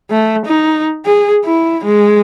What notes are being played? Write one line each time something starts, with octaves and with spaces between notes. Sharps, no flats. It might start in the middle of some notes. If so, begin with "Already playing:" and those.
A3
D#4
G#4
E4
G#3